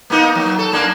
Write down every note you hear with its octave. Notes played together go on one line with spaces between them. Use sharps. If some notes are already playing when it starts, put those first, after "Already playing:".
A#3 B3 D#4
F#3
A4
F#2 A#3 D4